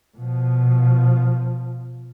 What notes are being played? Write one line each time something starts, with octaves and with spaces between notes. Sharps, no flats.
B2 F3